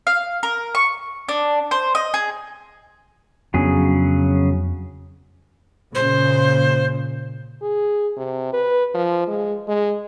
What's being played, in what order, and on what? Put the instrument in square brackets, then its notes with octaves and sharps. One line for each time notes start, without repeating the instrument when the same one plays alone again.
[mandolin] F5
A#4
C#6
D4
C5
D#5
G#4
[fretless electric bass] F2 B3 D4 [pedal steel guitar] C#3 F#3 G#4
[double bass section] A#2 C#3 [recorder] C5
[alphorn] G#4
C3
B4
F3
G#3
G#3